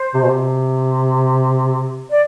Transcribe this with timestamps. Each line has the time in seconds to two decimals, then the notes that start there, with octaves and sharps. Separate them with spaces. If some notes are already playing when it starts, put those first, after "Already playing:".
Already playing: C5
0.14 C3
0.21 B2
0.28 C3
2.10 D5